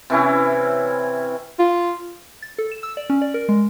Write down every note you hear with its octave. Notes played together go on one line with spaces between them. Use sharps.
C3 E3 C#4 E4
F4
A6
A4
E7
E6
D5
C#4
D5
A#4
G#3